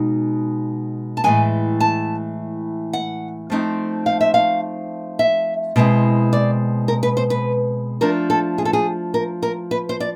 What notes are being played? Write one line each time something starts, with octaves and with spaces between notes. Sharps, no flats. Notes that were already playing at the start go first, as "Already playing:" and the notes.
Already playing: B2 G#3 D#4
A5
A2 E3 G#3 G#5
A5
F#5
F3 A3 C4 D#4
F5
E5
F5
E5
B2 G#3 C4 E4
D5
A#4
B4
C5
B4
F3 A3 D4 A#4
A4
G#4
A4
G#4
A#4
A#4
B4
C5
D5